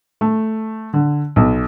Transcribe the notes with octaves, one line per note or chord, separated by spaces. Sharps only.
A3
D3
B1